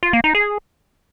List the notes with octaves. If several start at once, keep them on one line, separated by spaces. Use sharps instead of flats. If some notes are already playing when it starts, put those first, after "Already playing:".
F4
A#3
D#4
G#4